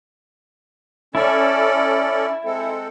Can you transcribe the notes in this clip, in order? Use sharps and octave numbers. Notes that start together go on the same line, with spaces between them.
C#4 E4 A4 D5
G#3 C4 A4